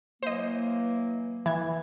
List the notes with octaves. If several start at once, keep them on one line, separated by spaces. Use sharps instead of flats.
E3 F#3 A#3 C5 D#5
E3 G#6